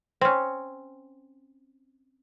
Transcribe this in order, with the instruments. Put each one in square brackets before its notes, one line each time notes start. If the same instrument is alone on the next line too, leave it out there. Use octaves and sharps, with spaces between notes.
[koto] C4 C#4